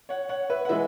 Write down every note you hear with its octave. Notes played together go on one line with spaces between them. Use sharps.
C#5 F#5
C#5 F#5
B4 E5
F#5
E3 G#3 B4 E5